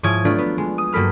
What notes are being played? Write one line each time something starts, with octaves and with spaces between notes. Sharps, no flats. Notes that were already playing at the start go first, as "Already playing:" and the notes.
G#2 F3 E4 C#5 D#6 G#6
F#3 A3 B3 D4 F4
B3
G#3
D#6
G2 F#3 A#3 A4 B5 F6